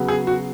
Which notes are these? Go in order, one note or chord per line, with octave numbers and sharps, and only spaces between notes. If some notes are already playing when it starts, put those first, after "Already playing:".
Already playing: C#3 F#3 B3
G#4
F#4